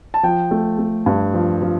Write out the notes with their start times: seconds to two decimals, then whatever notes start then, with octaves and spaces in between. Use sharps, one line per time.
0.14 A5
0.23 F3 G5
0.51 A3
0.79 A3
1.06 G2
1.34 F3
1.62 F3